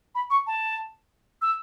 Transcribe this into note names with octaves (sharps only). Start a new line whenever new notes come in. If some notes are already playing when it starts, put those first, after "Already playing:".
B5
C#6
A5
E6